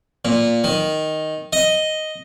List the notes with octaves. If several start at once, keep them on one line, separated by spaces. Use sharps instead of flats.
A#2
D#3
D#5